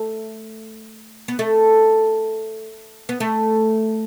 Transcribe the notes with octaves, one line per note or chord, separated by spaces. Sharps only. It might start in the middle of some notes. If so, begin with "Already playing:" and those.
Already playing: A3
B3
A3
B3
A3